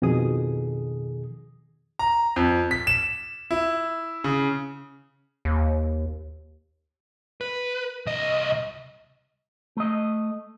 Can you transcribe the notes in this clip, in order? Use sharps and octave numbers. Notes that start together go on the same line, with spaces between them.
F2 B2 D#3 G#4 D#6
A#5
F2
B6
E7
E4
C#3
D#2
B4
C2 D#5
A3 D#5